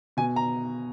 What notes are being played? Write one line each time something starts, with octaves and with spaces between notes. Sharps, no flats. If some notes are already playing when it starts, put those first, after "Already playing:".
B2 G#5
A#5